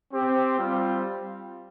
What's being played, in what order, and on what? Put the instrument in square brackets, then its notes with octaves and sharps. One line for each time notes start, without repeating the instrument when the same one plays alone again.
[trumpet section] C4 G4
G3 C4 F4